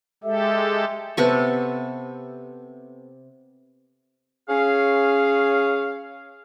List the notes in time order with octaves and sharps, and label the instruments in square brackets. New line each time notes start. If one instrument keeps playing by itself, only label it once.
[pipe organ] G#3 G4 A4 [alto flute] E5
[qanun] C3 B3 A4 C#6
[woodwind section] C#4 G#4 F5